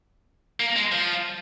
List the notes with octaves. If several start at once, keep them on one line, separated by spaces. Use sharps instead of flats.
A#3
G#3
F3